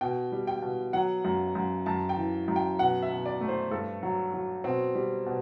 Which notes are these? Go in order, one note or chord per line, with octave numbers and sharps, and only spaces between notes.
B2 G5
G3
G5
B2
F#3 F#5
F#2
F#2
F#2 A5
G5
E3
F#2
G5
B2 F#5
E5
B2
D5
A3
C5
G2 A4
F#3
F#3
B2 C4
G3
B2